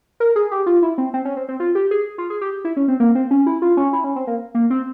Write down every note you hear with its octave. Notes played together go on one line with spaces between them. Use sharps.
A#4
G#4
G4
F4
E4
C4
C4
C#4
C4
C4
F4
G4
G#4
F4
G#4
G4
E4
C#4
C4
A#3
C4
C#4
E4
F4
C#4
E4
C#4
C4
A#3
A#3
C4